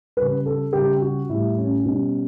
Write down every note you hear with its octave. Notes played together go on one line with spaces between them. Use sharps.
C#3 G3 B4
A4
C#3 G3 G4
F#4
A2 G3 E4
C#4
B2 G3